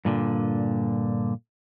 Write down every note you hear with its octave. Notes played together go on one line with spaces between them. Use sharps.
G2 A#2 D3